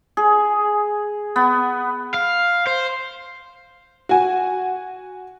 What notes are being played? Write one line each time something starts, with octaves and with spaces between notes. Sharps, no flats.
G#4
B3
F5
C5
F#4 G#5